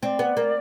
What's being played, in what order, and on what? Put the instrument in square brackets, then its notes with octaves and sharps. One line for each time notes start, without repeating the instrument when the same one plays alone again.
[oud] C4 [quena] D5
[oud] B3
A#3